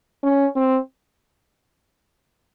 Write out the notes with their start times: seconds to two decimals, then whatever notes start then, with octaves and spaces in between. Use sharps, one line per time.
0.24 C#4
0.56 C4